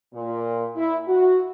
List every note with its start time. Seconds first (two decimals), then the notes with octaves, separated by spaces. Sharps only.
0.14 A#2
0.75 E4
1.08 F#4